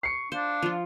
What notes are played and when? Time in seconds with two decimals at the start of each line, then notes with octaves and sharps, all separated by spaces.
0.03 C#6 C7 C#7
0.32 D4 C5 F5
0.62 F3 F4